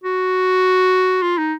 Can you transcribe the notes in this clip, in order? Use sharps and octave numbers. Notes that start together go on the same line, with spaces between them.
F#4
F4
D#4